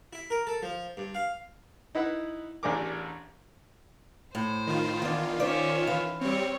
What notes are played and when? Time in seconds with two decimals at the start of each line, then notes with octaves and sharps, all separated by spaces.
0.13 E4
0.30 A#4
0.47 A4
0.62 F3
0.97 G2
1.15 F5
1.95 D#4 E4 B4 F#5
2.63 A1 E2 D4 G#4 A#4 D6
4.35 A2 C5
4.67 D#3 F4
5.02 E2 D4
5.40 C#4 C5 D5 E5
5.87 E3 F5
6.21 G3 C4 C#5